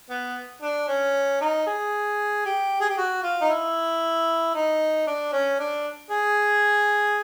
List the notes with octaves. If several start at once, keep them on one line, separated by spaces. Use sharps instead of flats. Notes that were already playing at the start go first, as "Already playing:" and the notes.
B3
D4
C#4
D#4
G#4
G4
G#4
G4
F#4
F4
D#4
E4
D#4
D4
C#4
D4
G#4